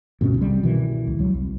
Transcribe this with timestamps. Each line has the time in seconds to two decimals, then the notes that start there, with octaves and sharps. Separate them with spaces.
0.21 D2 G2 B2 C#4
0.38 C2 G3
0.63 B2 D#3 E3
1.07 C#2
1.19 C#2 F#3
1.34 C2